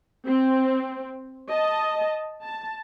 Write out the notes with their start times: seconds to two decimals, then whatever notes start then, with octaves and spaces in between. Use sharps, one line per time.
0.27 C4
1.50 D#5 A5
2.44 A5